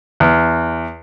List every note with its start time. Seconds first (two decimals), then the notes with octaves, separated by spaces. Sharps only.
0.20 E2